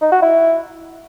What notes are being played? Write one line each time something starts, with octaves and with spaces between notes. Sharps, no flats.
D#4
F#4
E4